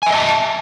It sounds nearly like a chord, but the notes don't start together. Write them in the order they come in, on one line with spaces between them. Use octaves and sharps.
G#5 E5 D#5 A5